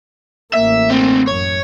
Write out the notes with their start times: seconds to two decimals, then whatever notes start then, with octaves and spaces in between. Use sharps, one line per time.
0.54 A1 A#3 E5
0.90 A3 C4
1.27 F#2 C#5